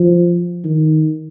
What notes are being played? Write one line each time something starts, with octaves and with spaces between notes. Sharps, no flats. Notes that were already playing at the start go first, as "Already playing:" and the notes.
Already playing: F3
D#3